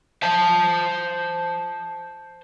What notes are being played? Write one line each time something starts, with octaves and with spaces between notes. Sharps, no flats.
C5 A5